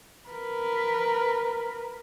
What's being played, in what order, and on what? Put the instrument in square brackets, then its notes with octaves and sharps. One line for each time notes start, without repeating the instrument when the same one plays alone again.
[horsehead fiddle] A#4 B4